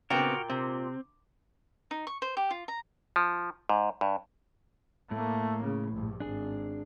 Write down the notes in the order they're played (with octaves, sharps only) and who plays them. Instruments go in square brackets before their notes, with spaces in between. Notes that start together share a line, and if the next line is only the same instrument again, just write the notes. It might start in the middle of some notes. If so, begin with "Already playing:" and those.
[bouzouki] A#2 G5 [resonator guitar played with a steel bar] C#3 B3 C4 [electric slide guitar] F#4 A#4
[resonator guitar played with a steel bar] C3 [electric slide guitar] C4
[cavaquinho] D#4
C#6
C5
G4
F4
A#5
[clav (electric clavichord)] F3
G#2
G2
[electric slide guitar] A2 [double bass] A3 A#3
[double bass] C#3
A#1 G2
[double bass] G#1 [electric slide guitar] D4 G#4